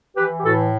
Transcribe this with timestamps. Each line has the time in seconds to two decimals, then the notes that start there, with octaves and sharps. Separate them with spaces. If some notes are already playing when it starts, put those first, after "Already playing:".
0.17 E3 G4 B4
0.39 G4
0.44 A2 F#4 A4